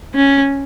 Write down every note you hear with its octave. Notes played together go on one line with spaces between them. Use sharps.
C#4